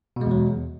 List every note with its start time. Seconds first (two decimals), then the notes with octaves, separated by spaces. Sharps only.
0.16 B2
0.21 G#3
0.26 E2
0.31 F#3